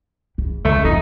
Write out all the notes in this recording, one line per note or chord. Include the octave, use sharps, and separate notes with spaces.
E2
C#2 A3
F2 C4 D#4